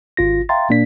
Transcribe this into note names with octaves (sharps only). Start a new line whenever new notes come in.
G#1 F4 A#6
E5 F5 G5 A#5 C6 A6
A#2 A#3 D4 D5 B6